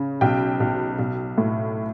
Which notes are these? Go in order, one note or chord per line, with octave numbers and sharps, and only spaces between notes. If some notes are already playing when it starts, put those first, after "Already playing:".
Already playing: C#3
B1 G5
B1
B1
A2